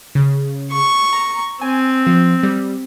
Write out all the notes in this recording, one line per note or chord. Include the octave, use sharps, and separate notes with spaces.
C#3
C#6
A#5
C4 G#5
F3
G3